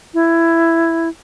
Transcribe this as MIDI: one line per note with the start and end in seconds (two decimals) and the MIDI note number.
0.14 1.09 64